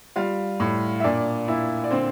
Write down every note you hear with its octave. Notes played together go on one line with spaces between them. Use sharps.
G3 F4 F5
A2
E5
A#2 D4 D5
A#2 E4
D5
D3 C4 C5